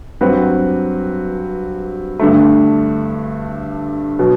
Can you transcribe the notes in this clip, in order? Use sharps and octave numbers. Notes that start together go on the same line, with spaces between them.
G2 F#3 C4 F#4 B4
G2 D3 A3
B2 F#3